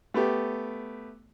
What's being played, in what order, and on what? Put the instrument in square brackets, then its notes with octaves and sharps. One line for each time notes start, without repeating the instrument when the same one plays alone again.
[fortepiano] A3 B3 G4